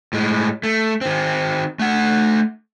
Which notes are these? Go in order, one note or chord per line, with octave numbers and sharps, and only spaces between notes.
A2 G#3
A3
D#3 C4
A3 F#5